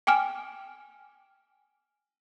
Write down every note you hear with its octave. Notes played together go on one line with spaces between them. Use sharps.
G5 G#5 D6 F6